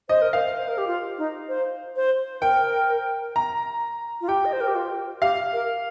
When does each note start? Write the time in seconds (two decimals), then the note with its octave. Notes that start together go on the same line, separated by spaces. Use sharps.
0.09 C5 D#5
0.22 A#4
0.33 C5 F5
0.59 C5
0.68 A#4
0.78 G4
0.87 F4
1.18 D#4
1.48 C5
1.96 C5
2.34 C5
2.42 A#4 G5
3.36 A#5
4.21 F4
4.28 G4 G5
4.45 D#5
4.53 C5
4.61 A#4
4.68 G4
4.75 F4
5.21 G4 F5
5.53 A#4